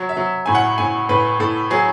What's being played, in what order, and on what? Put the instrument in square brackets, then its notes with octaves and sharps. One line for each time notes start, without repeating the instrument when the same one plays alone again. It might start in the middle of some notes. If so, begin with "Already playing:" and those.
Already playing: [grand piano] F#3
E5
F#3
A2 G#5
F#5
A2 G#5
A2 B4
A2 A4
F#3 G#4